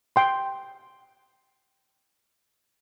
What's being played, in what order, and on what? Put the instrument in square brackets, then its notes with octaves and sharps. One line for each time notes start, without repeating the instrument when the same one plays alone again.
[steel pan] G5 C6